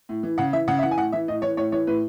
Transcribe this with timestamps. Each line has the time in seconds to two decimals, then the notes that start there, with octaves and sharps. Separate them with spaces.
0.09 A2
0.23 E3
0.38 C#3 F#5
0.53 E3 E5
0.68 C#3 F#5
0.79 E5
0.83 E3 F#5
0.91 G#5
0.97 A2 F#5
1.12 E3 E5
1.28 A2 D#5
1.42 E3 C#5
1.57 A2 C#5
1.72 E3 C#5
1.87 A2 B4